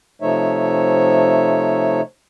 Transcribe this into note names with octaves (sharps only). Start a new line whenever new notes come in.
C3 F3 A3 D#4 C#5 E5